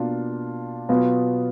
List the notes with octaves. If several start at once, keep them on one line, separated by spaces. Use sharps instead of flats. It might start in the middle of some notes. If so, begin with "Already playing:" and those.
Already playing: B2 A#3 D4 F4
B2 F#3 B3 F4